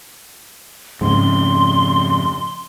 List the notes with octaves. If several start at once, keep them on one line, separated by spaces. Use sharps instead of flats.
F2 G#2 C#3 C6